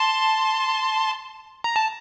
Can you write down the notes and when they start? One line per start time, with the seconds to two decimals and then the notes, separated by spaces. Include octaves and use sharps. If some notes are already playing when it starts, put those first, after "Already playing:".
Already playing: A5 C6
1.64 A#5
1.76 A5